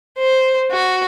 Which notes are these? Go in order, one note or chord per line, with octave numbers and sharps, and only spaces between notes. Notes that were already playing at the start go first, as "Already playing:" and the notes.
C5
F#4